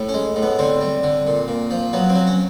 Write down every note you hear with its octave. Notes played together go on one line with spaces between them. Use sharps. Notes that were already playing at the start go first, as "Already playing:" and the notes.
Already playing: A2
C#4
G#3
A2
B3
D3 C4
G3
D3
A#2
A#2
F3
F#3 B3
C4
F#3
C#4